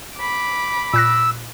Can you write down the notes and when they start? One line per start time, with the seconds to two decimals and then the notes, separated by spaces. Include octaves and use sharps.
0.18 B5 D6
0.94 A#2 E6 F#6 A#6